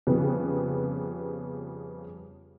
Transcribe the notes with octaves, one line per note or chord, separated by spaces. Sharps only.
F2 C#3 G3 B3